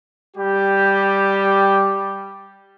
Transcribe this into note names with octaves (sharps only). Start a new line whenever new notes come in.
G3 G4